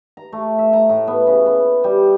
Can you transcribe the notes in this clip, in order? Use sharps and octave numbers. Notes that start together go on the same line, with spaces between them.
A#5
A3
E5
A#5
A2
B3
C#3
B3
G3